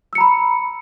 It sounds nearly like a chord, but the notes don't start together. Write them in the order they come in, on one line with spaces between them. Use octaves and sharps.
E6 C#7 A#5 B5